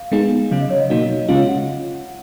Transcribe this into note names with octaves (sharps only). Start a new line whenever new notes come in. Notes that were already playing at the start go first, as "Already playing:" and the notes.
Already playing: F5
G#3 B3 D#4 G#4
C#3 F#3 C#4 F5
D#5
C#5
D#5
B2 F#3 A#3 D#4 F#4
C#3 G#3 C#4 F4 F5
F#5